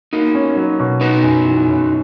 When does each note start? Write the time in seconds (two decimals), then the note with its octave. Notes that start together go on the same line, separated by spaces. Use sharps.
0.13 A#3 D#4 F#4
0.35 C#4
0.57 F#3
0.79 B2
1.01 B3 D#4 F#4
1.23 F#2
1.45 E3
1.68 F#2